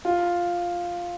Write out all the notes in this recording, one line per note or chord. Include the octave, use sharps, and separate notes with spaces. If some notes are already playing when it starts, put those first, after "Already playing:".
F4